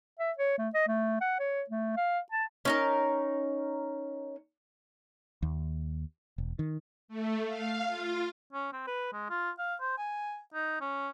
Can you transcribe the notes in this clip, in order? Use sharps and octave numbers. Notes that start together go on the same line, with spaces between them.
E5
C#5
A3
D#5
A3
F#5
C#5
A3
F5
A5
C#4 D#4 A#4
D#2
E1
D#3
A3
F5
F4
C#4
C4
B4
G#3
F4
F5
C5
G#5
D#4
C#4